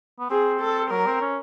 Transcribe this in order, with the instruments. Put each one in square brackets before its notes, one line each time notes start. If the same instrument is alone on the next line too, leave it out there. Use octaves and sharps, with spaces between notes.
[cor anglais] B3
[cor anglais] C4 [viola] G#4
[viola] A4
[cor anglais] F#3 [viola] A#4
[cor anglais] C4
C#4